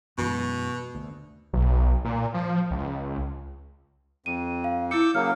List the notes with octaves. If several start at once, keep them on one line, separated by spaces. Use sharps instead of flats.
F#2 B2 E3 G#3
D2
B1
A#2
F3
C#2
F2 D#7
F5
E4 D6 E6 G6 C#7
C#3 F#3 A#3 F6